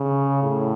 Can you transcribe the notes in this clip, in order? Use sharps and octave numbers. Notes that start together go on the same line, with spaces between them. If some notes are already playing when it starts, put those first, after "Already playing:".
Already playing: C#3
A2